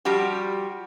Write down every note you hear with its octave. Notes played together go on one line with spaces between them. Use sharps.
F3 G3 F#4 G4